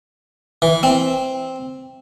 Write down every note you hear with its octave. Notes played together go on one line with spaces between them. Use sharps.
E3
C4